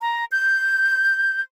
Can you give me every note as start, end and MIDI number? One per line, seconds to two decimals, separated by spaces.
0.01 0.25 82
0.31 1.40 91